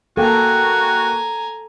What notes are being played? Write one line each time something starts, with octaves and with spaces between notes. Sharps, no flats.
A#3 F#4 A4 G5 G#5 A#5